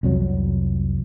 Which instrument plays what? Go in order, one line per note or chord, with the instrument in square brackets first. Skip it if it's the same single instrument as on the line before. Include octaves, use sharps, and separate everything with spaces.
[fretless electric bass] C2 F2 F#3